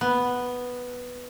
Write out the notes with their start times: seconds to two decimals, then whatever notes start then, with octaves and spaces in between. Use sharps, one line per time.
0.01 B3